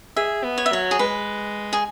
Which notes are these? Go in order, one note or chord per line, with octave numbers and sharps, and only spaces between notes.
G#4 E5
B3
C#5
E5
F#3 C#5
G#4
G#3 B4
G#4